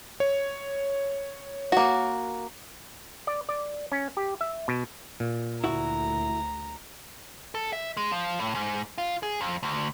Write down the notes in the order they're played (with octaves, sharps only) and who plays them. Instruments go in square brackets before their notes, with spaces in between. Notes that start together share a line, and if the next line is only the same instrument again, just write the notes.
[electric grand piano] C#5
[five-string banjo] A#3 F#4
[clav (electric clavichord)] D5
D5
C#4
G4
E5
B2
A#2
[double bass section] D2 [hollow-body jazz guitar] E4 F#4 [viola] A#5
[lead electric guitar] A4
E5
G#3
F3
A2
G#2
F4
G#4
F2
D2